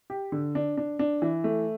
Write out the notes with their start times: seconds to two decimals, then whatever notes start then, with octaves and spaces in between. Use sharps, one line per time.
0.10 G4
0.32 D3
0.55 D4
0.77 D4
0.99 D4
1.22 E3
1.44 A3